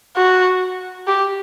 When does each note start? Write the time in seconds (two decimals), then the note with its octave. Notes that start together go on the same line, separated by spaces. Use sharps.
0.17 F#4
1.07 G4